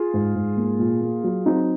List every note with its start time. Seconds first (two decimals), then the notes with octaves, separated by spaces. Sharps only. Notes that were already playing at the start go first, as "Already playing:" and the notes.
Already playing: F4 G#4
0.14 G#2
0.35 G#2
0.57 A#3
0.79 A#2
1.01 A#3
1.24 F#3
1.46 F#3 C4 D#4